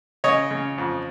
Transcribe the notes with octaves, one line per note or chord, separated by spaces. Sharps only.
C#3 C#5 D#5
C#3
F2